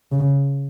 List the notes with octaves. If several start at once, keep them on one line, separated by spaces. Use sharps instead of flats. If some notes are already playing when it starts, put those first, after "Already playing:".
C#3